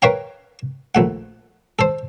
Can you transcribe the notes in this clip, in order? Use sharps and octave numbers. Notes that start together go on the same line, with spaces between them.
A#4 B4 C#5 F5 G5 A#5
A#1 A3 F#5
A4 C5